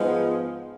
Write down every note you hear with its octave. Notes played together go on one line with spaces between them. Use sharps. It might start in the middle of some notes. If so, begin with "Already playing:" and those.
Already playing: G#2 F3 G#3 B3